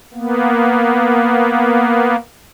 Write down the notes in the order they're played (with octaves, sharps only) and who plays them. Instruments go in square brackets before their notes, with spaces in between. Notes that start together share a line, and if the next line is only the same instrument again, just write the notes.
[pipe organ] A#3 B3